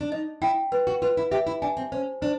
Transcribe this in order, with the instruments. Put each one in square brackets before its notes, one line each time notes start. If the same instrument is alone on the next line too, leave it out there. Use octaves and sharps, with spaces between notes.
[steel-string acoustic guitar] D4
[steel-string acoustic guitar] D#4 [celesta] D#5
[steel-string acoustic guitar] E4 [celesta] G5
[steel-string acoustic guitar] F4 [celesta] B4
[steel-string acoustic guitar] F#4
[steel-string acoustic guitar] F4 [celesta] B4
[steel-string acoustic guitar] E4
[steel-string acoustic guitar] G4 [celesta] E5
[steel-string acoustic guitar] E4
[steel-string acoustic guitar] D4 [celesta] G#5
[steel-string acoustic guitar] C4
[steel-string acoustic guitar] C#4 [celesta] C5
[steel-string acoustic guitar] D4 [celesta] C5